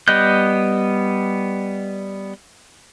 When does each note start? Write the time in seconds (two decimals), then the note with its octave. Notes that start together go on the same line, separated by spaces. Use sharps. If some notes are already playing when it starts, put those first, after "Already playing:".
0.08 G3 B3 D#5 F#6 G6